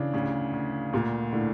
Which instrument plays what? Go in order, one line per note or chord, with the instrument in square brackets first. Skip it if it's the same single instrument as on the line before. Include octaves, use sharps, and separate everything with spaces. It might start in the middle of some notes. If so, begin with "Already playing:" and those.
Already playing: [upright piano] C#3 E3 [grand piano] D4
[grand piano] D2 [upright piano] C#3
[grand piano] D2
[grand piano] D2 [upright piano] A#2
[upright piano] A2 [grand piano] D3